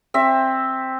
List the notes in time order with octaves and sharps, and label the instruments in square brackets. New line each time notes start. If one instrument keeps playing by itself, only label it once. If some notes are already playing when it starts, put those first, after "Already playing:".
[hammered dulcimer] C4 E5